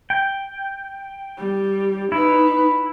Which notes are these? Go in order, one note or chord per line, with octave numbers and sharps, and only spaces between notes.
G5
G3
D#4 E4 B4